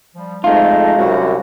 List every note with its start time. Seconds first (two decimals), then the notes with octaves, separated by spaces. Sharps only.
0.15 F3 G3
0.44 F2 G#3 A3 D#4 F4
0.97 C2 F#2 F#4